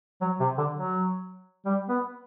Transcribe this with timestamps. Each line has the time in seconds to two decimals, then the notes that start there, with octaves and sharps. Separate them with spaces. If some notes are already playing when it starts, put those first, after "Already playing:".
0.21 F#3
0.40 C3
0.58 D3
0.75 F#3
1.66 G3
1.89 B3